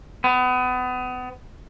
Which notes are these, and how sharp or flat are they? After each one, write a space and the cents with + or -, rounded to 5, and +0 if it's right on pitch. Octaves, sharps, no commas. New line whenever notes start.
B3 +30